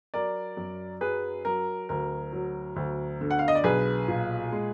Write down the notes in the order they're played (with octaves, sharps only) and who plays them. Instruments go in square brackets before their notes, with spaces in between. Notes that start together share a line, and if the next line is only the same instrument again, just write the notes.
[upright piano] F#3 A#4 D5
F#2
F#3 G#4 B4
F#3 A#4
D2 A#4
F#3
D2
D3
F#5
F5
D#5
D5
B1 G#4 B4
A#2
G#3